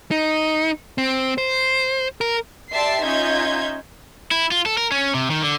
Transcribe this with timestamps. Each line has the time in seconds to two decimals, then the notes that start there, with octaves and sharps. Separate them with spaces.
0.11 D#4
0.98 C4
1.38 C5
2.21 A#4
2.71 G4 D5 E5 A5 C6 C7
3.03 C#4 D#4 F4 E5 G6 G#6
4.31 E4
4.51 F4
4.66 A4
4.77 A#4
4.92 C#4
5.14 C3
5.30 D#3
5.42 D3